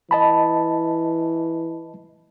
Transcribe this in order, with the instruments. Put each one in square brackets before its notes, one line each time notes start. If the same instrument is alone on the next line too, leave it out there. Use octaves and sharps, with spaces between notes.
[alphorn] E3 [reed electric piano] D#5 A5 B5